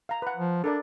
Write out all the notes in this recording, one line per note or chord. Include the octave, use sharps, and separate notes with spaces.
F5 A#5
B4 F#5
F3
D4 A4 A#4 D5